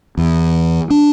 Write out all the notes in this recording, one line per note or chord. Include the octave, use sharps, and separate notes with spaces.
E2
D4